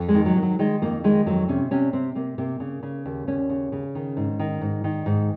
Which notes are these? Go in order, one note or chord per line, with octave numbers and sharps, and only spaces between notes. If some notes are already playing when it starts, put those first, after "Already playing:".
Already playing: F2
G#3
D#3
F#3
D#3
F#3
D#3 G#3
F2 A#3
D#3 G#3
F2 F#3
C3 C#4
C3 C#4
C3 C4
C3 A#3
C3 A#3
C#3
C#3
D#2
D#2 C#4
C#3
C#3
D#3
G#2
D#3
G#2
D#3
G#2